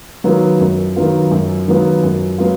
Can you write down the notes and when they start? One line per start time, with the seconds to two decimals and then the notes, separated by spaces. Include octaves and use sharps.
0.24 D#3 F#3 B3 F4
0.60 F#2
0.96 D#3 F#3 B3 F4
1.31 F#2
1.67 D#3 F#3 B3 F4
2.03 F#2
2.38 F#3 B3 F4